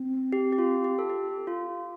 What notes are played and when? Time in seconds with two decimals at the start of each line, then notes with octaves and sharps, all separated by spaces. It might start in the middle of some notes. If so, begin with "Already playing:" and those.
Already playing: C4
0.33 G4
0.52 G4
0.58 F4
0.84 G4
0.99 A4
1.10 G4
1.47 F4